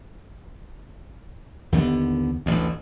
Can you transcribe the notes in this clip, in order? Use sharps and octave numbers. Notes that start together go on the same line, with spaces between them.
D#2 D3 A#3 B3
A1 D2